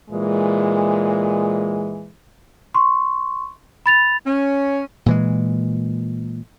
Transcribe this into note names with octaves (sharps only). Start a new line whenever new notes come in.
A#2 E3 G#3
C6 C#6
B5 A6 F7
C#4
A#2 E3 G#3